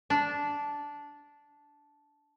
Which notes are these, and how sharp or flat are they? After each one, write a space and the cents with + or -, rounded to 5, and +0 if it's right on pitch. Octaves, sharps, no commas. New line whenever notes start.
D4 -10